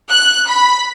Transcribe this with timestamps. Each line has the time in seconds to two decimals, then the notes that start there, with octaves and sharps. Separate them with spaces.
0.10 F#6
0.48 B5